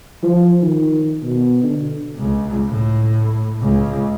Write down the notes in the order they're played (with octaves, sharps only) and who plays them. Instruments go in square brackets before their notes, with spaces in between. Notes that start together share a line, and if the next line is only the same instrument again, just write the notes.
[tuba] F3
D#3
B2
D3
[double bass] C#2
A2
C#2